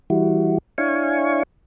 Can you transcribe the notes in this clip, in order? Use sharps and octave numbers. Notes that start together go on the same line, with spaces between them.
E3 G3 E4 F#4
D4 E4 C#5 F5 G#5 C#6